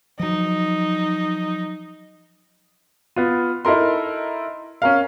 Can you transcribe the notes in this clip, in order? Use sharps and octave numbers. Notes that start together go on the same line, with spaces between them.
F3 F#3 D#4
B3 F4
D#4 E4 A4 A#4 C6
C#4 A#4 F5